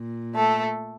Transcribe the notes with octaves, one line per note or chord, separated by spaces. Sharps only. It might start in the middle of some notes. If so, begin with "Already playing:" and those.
Already playing: A#2
A3 A4